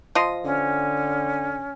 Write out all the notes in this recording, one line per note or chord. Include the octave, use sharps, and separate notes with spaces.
F3 D#5 C6
D3 C#4